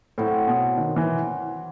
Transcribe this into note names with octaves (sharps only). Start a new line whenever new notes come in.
A2 F#3 C4 F#4
B2
D#3
E3